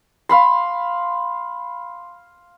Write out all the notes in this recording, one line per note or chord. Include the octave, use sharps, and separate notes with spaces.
F5 B5 C6